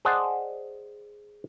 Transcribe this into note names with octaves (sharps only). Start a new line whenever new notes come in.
G#4 C5 D5 D#5 F#5 A5